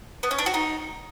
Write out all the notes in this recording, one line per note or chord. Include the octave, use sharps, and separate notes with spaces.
B3
C#4
D4
F#4
D#4